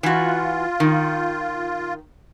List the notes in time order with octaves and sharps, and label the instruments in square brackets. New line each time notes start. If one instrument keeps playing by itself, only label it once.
[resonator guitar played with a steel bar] E3 F#4 [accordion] F4
[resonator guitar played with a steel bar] D#3